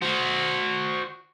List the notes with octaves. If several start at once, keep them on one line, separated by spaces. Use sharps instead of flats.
F#4 C5